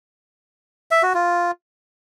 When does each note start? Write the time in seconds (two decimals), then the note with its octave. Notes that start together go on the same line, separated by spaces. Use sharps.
0.91 E5
1.03 F#4
1.15 F4